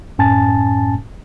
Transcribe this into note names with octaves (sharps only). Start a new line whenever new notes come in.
F#2 A2 C#4 G#5 A5 A6